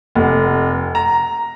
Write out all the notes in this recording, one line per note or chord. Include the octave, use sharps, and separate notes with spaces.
F1
A#5